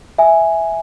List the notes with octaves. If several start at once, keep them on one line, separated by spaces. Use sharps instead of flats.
E5 G#5